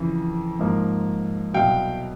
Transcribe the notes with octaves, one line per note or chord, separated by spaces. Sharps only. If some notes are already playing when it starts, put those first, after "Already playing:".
Already playing: F2 C#3 E3
G#2 F3 A#3
C2 B2 F#3 F5 G5